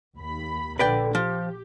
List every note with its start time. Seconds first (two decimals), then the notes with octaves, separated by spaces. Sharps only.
0.16 D#2 B5
0.79 A#1 D3 B4 D5 G5
1.15 F3 G4